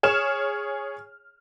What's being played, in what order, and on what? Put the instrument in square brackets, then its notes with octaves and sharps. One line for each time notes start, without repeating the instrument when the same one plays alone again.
[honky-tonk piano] G#4 C#5 F6 E7